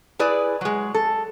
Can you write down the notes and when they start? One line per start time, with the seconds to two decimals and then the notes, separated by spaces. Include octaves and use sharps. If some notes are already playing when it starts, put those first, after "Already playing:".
0.19 E4 G#4 B4 D5 G#5
0.61 F#3 G#3
0.94 A4